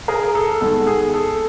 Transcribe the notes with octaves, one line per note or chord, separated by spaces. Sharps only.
G#4 A#4
A4
D#3 G#3 B3 A4
G#4
A4